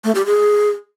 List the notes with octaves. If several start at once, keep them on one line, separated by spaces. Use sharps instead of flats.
A3
G4
G#4